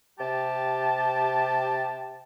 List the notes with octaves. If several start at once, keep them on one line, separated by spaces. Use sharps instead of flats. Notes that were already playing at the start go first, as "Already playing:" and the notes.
C3 G4 A5